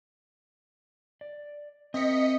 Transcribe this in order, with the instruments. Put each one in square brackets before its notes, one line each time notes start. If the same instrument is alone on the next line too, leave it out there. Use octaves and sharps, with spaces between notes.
[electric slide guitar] D5
[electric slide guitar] C4 A#4 E5 [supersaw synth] D#5 B6 C#7